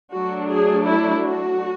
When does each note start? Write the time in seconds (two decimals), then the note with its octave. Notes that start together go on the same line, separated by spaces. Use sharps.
0.13 F#3 A3 D4 F#4
0.50 G#4
0.87 E4
1.25 F#4